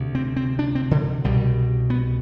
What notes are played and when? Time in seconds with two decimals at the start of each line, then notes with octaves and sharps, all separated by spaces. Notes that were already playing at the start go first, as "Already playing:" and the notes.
Already playing: D2 C3
0.15 C4
0.36 C4
0.59 D4
0.75 C4
0.91 D3
1.24 C2 B2 G3
1.90 B3